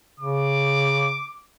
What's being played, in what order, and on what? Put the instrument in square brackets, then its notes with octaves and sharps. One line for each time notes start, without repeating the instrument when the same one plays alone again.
[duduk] C#3 [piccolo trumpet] D6